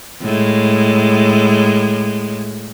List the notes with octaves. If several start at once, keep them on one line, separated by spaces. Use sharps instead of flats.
A2 G#3